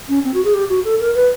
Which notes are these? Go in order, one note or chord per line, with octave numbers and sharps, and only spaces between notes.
C#4
C4
F#4
G#4
G4
F#4
A4
A#4
B4